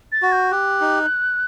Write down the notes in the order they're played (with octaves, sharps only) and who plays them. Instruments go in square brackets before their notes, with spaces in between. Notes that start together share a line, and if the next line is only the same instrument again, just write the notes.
[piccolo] A6
[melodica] F#4
[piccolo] G6
[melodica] G4 [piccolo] F#6
[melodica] D#4